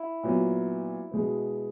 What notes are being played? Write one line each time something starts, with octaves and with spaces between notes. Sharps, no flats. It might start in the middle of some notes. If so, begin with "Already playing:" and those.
Already playing: E4
A#2 F#3 B3
B2 G#3 B3